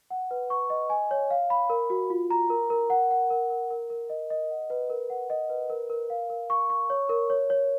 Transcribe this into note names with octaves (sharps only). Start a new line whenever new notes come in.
F#5
B4
C#6
D#5
G#5
C#5
F5
B5
A#4
F#4
F4
A#5
A#4
A#4
F#5
F#5
A#4
A#4
A#4
A#4
D#5
D#5
F#5
B4
A#4
F#5
D#5
B4
A#4
A#4
F5
A#4
C#6
C#6
C#5
A#4
C#5
C#5